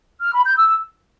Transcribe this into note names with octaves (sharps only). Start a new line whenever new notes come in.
F6
B5
G6
E6